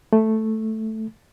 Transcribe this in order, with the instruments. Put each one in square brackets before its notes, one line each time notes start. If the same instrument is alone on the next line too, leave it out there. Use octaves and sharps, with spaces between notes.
[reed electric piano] A3